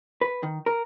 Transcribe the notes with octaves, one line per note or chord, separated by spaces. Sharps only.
B4
D#3
A#4